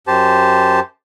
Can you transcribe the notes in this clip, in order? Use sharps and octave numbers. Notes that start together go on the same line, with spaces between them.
F#2 G4 C5 A5